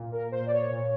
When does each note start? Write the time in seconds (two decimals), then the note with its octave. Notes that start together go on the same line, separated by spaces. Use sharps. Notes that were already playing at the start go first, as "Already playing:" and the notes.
Already playing: A#2
0.12 A#4
0.31 A#2 C5
0.46 D5
0.51 C#5
0.70 A#2